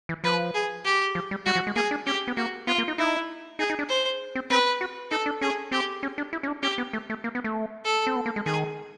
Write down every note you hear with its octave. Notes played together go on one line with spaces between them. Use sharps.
E3
F3 B4
G#4
G4
F3
G3
G3 F#4
F3
G#3
A#3 G#4
D4
C#4 G4
B3
A#3 F#4
B3 F4
A#3
D#4
D#4 E4
D#4 G#4
D#4
D4
C5
C4
C4 B4
F#4
D#4 A4
D4
C#4 G#4
C4 G4
C#4
D4
E4
C#4
D4
C#4 G4
B3
A3
A3
A#3
B3
A3
A4
C4
B3
A#3
G#3
D#3 G#4